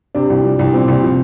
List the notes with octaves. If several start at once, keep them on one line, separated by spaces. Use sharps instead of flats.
C3 D4
C2
F3
C2
A#2 C4
C2
F3